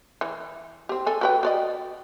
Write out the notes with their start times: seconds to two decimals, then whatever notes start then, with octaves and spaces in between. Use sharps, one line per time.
0.21 E3
0.89 C4 G4
1.07 A4 G#5
1.21 F#4 B4 G5
1.43 F#4 D5 D#5